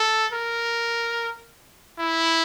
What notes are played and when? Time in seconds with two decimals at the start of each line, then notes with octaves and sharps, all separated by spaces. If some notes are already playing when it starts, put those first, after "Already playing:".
Already playing: A4
0.33 A#4
1.99 E4